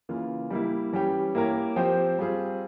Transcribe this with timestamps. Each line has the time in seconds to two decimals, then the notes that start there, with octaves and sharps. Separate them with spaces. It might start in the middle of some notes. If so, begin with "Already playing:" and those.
0.09 C#3 E3 A#3 F4
0.50 G3 A#3 E4
0.93 E3 G3 C#4 G4
1.35 A#3 E4 G4 A#4 C#5
1.76 F3 C4 G4 C5
2.19 G3 C4 F4 G#4